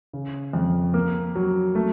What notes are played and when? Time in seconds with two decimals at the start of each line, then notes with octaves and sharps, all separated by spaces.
0.13 C#3
0.53 F2
0.94 A#3
1.36 F#3
1.75 A3